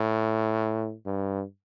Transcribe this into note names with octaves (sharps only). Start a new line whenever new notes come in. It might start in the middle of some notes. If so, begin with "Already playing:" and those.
Already playing: A2
G2